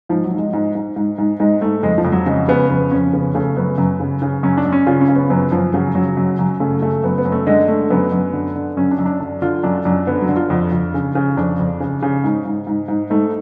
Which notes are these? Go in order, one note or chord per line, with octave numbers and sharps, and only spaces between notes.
G#2 F3
F#3
G#2
G#3
G#2 G#3
G#2
G#2
G#2
G#2 G#3
G#2 A3
F2 G#3
F3
F2
F#3
C#3 G#3
C#3 B3
F2 B3
F2 C#4
C#3 B3
C#3 A3
F#2 B3
F#2
C#3
C#3
F#2 C#4
D4
F#2
C#4
C#3 F4
C#4
C#3
B3
F#2 B3
F#2 F3
C#3 F#3
C#3 F#3
F#2
F#2
C#3 A3
C#3 A3
F#2 B3
B3
F#2
A3
D3 G#3
D3 A3
F#2 B3
F#2
D3
D3
F#2 C#4
D4
F#2
D4
D3 D4
D3 F4
F#2 D4
F#2 D4
D3 B3
F#3
D3
F4
F2
F2
C#3
C#3
F2 D4
F2
C#3
C#3
G#2
G#2
G#2
G#2
G#2 A3